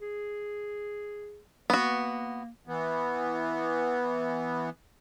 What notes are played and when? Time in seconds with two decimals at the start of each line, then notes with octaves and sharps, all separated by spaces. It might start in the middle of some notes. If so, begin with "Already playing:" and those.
0.01 G#4
1.70 A#3 B3 F#4
2.67 E3 B3